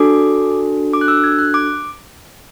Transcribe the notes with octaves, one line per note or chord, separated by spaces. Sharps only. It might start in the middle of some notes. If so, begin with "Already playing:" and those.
Already playing: D4 F#4 A4 D6
D6
F#6
E6
G#6
F#6
D6